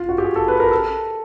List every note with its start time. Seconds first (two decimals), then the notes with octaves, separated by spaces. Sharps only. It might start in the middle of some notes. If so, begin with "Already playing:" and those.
Already playing: F4
0.09 F#4
0.18 G4
0.24 G#4
0.36 A4
0.48 B4
0.60 A#4
0.71 A4